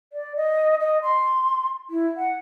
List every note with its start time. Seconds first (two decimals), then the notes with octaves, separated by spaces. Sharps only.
0.13 D5
0.37 D#5
0.80 D#5
1.03 C6
1.90 E4
2.17 F#5